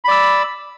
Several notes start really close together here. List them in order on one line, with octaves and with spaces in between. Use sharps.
B5 D5 E6